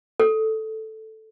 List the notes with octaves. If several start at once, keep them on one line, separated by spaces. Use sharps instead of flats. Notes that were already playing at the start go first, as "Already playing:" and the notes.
A4